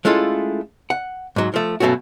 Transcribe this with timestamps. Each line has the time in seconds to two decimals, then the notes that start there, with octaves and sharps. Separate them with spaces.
0.05 G#3 A3 C#4 E4 F4 A4
0.90 F#5
1.36 G#2 F#3
1.54 F3 A3
1.80 G2 B2 F#3 A3 C#4 F#4